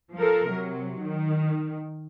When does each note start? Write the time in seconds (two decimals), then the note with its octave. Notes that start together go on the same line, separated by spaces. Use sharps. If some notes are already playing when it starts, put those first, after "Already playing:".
0.14 F3 A4 A#4
0.51 C3 F#3
1.02 D#3